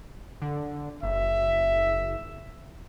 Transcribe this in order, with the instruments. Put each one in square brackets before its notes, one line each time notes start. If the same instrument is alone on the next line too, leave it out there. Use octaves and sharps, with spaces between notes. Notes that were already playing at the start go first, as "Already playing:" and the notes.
[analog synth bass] D3
[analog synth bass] F#1 [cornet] E5